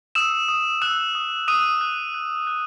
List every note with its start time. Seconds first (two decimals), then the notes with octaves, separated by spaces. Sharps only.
0.15 D#6 E6 E7
0.49 D#6
0.82 E6 F#6 E7
1.15 D#6
1.48 D#6 F#6 D#7
1.81 F#6
2.14 F#6
2.47 F#6